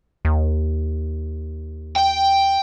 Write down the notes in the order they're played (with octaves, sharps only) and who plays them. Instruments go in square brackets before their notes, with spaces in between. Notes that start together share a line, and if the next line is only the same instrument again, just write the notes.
[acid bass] D#2
[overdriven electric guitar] G5